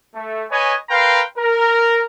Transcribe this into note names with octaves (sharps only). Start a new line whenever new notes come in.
A3
B4 C#5 D#5 G#5
A#4 B4 F5 G5 A#5 C6
A#4